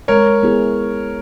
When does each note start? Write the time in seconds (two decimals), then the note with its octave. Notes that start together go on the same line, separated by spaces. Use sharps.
0.08 G#3 A#4 C#5
0.43 B3 E4 G#4